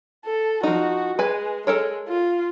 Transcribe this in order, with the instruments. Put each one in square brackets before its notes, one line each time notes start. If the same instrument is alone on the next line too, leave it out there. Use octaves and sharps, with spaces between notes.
[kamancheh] A4
[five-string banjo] F3 D#4 [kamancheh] F#4
[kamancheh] G#3 [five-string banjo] B4 G#5
[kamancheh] G#3 [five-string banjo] A4 A#4 C#5
[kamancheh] F4